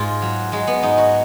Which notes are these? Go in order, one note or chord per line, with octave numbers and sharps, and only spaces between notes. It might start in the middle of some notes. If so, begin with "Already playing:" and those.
Already playing: G#2 F4
F#3
F#3 G#3
B3
G#2 D#4
F#4